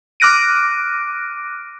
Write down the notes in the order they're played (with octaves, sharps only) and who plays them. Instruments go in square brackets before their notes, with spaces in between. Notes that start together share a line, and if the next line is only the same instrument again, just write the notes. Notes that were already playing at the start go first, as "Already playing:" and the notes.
[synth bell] D6 F6 F#6 A#6 D7 D#7